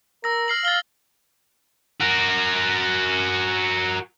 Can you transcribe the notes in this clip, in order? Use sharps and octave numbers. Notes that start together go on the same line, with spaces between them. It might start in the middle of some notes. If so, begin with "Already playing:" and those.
A#4 E6 A#6
F6 C7 F#7
F5 A6 G7
F#4 A#4